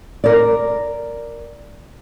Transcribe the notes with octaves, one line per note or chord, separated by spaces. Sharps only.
A#4 D5